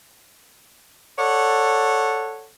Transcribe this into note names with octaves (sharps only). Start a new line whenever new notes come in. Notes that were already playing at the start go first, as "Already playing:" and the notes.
A4 C#5 D5 F#5